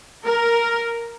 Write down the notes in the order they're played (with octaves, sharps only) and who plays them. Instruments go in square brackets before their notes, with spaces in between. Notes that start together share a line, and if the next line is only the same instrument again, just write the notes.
[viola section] A#4